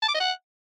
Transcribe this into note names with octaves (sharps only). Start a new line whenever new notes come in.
A5
D6
D#5
F#5